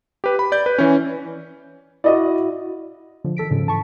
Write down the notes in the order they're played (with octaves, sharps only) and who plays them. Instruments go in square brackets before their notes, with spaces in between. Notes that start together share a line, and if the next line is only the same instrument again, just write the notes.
[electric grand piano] G4 B4
B5
D5 G6
B4
E3 C#4
[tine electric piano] E4 F#4 [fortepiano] D5 D#5
[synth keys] D3 F3
D#3 A4 B6 D7
G#2 C#3 F3
E3 A5 C#6